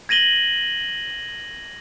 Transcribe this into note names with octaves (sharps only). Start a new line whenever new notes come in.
G#6 A#6 D#7 F#7 G7